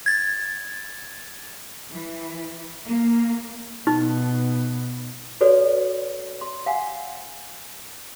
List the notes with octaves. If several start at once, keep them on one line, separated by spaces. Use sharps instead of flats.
G#6 A6
E3
A#3
B2 D#4
F#4 A4 B4 C#5 D5
C6
F5 F#5 G#5